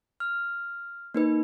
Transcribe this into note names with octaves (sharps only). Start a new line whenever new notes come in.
F6
A#3 D#4 B4